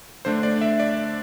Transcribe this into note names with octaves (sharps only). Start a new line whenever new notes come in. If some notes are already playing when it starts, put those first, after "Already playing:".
D3 A3 D4 C5
D5
E5
D5